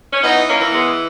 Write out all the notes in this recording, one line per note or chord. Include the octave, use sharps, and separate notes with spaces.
C#4
E3 B3 D#4
A#3 C#4
E3
G#3 B3